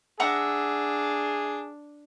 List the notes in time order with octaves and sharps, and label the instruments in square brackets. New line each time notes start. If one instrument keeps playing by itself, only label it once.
[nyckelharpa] D4 [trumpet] G#4 [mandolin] E5 F#5 A#5